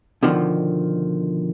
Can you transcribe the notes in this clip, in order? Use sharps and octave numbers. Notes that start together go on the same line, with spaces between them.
B2 D3 D#3 F3